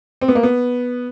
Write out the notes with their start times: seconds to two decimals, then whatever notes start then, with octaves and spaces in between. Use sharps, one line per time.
0.21 C4
0.28 B3
0.35 A#3
0.43 B3